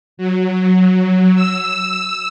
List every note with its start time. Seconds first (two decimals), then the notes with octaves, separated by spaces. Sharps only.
0.17 F#3
1.35 E6